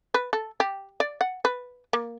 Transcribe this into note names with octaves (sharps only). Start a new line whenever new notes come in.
B4
A4
G4
D5
F#5
B4
A#3